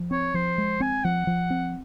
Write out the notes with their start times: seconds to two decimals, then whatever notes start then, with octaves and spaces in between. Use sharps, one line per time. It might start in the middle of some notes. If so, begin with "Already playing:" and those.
Already playing: F3
0.11 C4 C#5
0.34 F3 C5
0.58 G#3
0.80 C4 G#5
1.04 F3 F#5
1.27 F3
1.50 C4